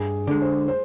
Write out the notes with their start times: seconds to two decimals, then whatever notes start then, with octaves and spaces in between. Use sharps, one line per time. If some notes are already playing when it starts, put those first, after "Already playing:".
Already playing: G2 G#4
0.27 D3 G#3
0.42 C5
0.68 C5